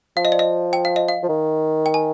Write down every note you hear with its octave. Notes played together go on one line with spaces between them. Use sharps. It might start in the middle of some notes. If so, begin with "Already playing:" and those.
F3 F5
D#5
D5
D#5
G5
F5
D#5
F5
F3
D#3
G5
G#5